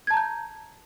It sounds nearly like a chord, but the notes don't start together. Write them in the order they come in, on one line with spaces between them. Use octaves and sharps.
G#6 A5 A#5 G6